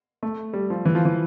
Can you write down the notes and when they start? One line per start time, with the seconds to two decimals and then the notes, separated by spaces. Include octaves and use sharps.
0.23 A3
0.53 G3
0.70 F3
0.85 E3
0.95 F3
1.05 E3